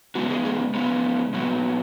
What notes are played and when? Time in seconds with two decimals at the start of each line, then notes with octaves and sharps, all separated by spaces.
0.15 C#3 G#3 B3 F#4
0.30 G#4
0.45 G#4
0.74 C#3 G#3 B3
1.33 A#2 F#3 B3